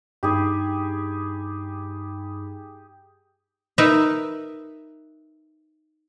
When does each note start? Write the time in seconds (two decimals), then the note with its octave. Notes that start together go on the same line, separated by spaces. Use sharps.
0.23 G2 D#4 G4 G#4 B5
3.78 D#4 A#4 B4 E5